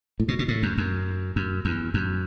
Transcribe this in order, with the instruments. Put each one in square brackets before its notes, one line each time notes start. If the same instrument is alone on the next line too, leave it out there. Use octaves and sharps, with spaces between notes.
[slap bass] A2
B2
B2
A2
F#2
F#2
F#2
E2
F#2